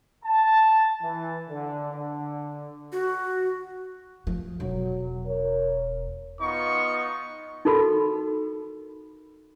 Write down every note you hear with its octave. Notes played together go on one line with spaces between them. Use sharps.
A5
E3
D3
D3
F#4
F3
E1 F#3
A#4 C#5
B3 D#4 F4 C#6
D#4 F#4 A4 A#4 B5